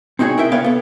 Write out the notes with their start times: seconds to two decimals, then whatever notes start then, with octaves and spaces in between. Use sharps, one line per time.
0.19 C4 D#4 F#4 G#4 C#5
0.38 E4 A#4 E5 G5
0.52 B3 D4 B4 C#5 F5
0.64 B3 A4